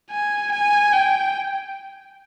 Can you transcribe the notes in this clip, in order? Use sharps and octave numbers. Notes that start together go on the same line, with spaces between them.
G#5
G#5
G5